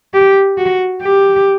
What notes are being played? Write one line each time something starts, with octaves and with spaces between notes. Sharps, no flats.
G4
F#4
G4